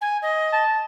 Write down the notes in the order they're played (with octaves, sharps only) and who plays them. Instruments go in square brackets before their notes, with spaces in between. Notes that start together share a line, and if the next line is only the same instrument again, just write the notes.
[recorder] G#5
D#5
[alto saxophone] A5